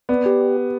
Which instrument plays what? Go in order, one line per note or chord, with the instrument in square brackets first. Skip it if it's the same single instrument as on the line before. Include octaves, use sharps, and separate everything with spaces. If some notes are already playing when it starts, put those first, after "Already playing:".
[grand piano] B3 [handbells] D5
[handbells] G4
G4
G4